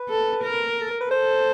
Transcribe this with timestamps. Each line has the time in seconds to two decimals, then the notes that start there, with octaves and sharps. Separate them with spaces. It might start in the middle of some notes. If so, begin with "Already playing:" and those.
Already playing: B4
0.10 A4
0.43 A#4
0.81 A4
0.91 A#4
1.01 B4
1.11 A4 C5